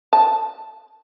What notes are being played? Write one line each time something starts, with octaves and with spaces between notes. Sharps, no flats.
A5